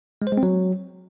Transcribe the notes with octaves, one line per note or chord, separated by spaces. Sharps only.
G#3
C5
G#3
C4
F#3